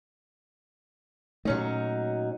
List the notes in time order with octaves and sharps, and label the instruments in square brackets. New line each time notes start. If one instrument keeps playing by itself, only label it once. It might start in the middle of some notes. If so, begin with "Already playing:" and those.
[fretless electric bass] A#2 A3 [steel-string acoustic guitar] F#3 C#4 D#4